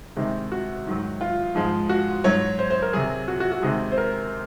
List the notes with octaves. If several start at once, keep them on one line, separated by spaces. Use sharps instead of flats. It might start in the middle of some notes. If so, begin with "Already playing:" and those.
C3 D#3 G#3
F#4
G#2 D#3 F#3
F4
G#2 F3 G#3
F#4
G#2 F#3 C#5
C5
C5
A#4
C3 F#3 G#4
F#4
F#4
F#4
C3 D#3 G#3 G#4
C5
A#4